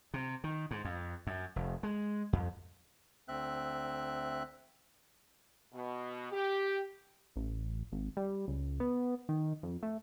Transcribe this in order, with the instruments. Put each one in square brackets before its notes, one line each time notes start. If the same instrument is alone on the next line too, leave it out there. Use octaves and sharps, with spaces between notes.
[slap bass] C3
D#3
G#2
F2
F#2
F1
G#3
F2
[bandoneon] D2 C4 E5 F#6
[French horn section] B2
G4
[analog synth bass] A1
G#1
G3
C#2
B3
D#3
F2
A3